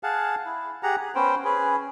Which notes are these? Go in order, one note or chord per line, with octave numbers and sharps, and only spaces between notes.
G#4 F5 F#5 A5
E4
G4 G#4 F#5 A#5
G#4
B3 C#4 C5 G5
C#4 G#4 B4